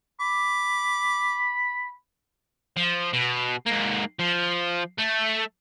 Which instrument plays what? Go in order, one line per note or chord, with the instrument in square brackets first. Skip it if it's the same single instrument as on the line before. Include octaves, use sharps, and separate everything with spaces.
[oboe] B5 [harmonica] D6
[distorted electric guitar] F3
B2
G#2 A#3
F3
A3